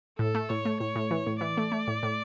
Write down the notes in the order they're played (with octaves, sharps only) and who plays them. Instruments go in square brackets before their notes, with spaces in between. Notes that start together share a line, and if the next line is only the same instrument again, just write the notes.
[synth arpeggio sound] A2 [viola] A4
[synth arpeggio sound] A3
[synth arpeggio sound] A2 [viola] C#5
[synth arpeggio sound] A3
[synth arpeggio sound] A2 [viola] C#5
[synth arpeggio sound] A2
E3
A2
[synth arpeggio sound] E3 [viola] D5
[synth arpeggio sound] A3
A3
A2
A2